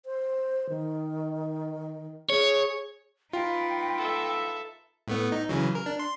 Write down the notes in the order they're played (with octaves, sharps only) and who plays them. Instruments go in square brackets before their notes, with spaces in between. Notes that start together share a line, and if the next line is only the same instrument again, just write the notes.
[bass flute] C5
D#3
[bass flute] G#4 [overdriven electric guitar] C#5
[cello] D#4 B4 [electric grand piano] F4 [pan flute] G5
[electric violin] A4 E5
[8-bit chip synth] A2 A3 B3
D#4
C#3 E3 F#3
A#4
D4
C6